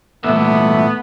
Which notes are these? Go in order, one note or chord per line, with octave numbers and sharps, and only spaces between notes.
E2 A#2 A3 B3 E4 E5